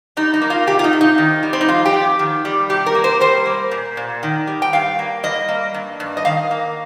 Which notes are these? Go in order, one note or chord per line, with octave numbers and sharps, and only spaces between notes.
G3 D#4
D#4
A#3
F4
C3 G4
F4
D#4
C3
D#4
D#3
G3
C4
D#4
F2 F4
G4
F2
D#3
G3
C3 G4
A#4
A#3
C5
G3 C5
A#3
A#2
A#2
D#3
G3
G5
G2 F5
A#3
G3 D#5
A#3
G2
G2
D#5
D#3 F5
A#3